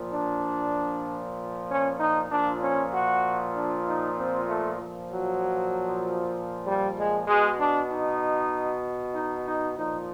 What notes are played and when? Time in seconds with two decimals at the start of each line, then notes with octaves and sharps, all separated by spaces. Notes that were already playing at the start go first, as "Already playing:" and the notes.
Already playing: A#2 F3
0.14 D4
1.69 C#4
2.00 D#4
2.30 A#2 F3 D4
2.62 C#4
2.93 F#4
3.55 D4
3.86 D#4
4.17 C4
4.48 A3
4.80 A#2 F3
5.10 F#3
6.66 G3
6.97 G#3
7.28 B2 G#3
7.58 D4
7.90 D#4
9.14 D#4
9.45 D#4
9.76 A#2 F3 D#4